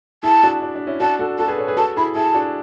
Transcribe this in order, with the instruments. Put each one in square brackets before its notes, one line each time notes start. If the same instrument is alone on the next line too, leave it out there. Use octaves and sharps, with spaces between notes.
[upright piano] E4 G#4 [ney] A5
[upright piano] D4 F#4
D4
D4
C#4 E4
[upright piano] D4 F#4 [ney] A5
[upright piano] F#4 A4
[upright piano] F#4 A4 [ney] A5
[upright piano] G#4 B4
A4 C#5
G#4 B4
[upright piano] F#4 A4 [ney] A5
[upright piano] E4 G#4 [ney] B5
[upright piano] E4 G#4 [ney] A5
[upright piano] D4 F#4